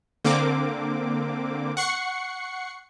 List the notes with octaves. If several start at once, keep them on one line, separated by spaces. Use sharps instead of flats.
D3 A#3 C4 D6
F#5 C#6 C7 C#7